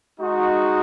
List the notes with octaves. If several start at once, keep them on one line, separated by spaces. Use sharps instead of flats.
G#3 D#4 F#4